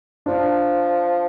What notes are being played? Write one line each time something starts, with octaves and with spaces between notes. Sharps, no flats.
F3 D4